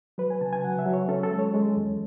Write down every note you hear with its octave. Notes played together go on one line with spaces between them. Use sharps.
F#3 B4
G#5
C#3 A5
G#5
F#3 F#5
E5
F#3
C#5
C#4 A4
A4
G#3
C#5
G#3
E2